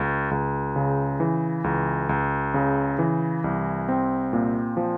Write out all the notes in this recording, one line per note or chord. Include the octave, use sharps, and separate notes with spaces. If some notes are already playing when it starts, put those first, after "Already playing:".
Already playing: C#2
C#2
C#3
E3
C#2
C#2
C#3
E3
C2
C4
A#2
F3